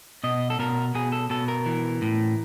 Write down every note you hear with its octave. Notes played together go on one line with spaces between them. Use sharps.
B2 D#5
A4
B2 A#4
B2 G#4
A4
B2 A4
A#4
E3
A2